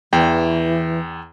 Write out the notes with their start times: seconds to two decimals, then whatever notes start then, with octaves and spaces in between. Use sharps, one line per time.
0.13 E2 E3 G5